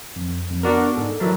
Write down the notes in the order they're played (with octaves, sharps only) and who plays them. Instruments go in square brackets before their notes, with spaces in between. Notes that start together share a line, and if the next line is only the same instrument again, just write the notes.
[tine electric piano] F2
F2
[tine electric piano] B3 D5 F#5 [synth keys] D4 F#4 A#4
[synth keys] G#2 [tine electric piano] A4
[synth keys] E3 F#3 D4 [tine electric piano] A#4 E5 A#5